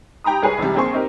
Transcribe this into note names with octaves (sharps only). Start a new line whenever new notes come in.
G4 G5 A#5 B5 D#6
C2 G#4 B4 C#5
C#2 C3 E3 G3
A#1 A#3 C4 G#4 C6 C#6
C4 D#4 G4 A#4